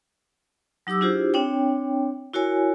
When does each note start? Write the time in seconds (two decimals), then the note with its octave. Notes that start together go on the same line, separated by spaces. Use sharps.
0.87 F#3 D#4 G4 D6 E6
1.01 D4 E4 F4 G4 G#4 C5
1.34 C4 D4 C#5 G5
2.34 E4 F#4 A#4 C#5 G#5